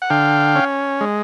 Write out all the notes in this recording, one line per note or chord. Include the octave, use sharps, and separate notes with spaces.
F#5
D3 F5 G5
C#4
G#3